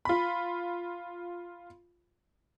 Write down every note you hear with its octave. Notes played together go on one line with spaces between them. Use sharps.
F4 B5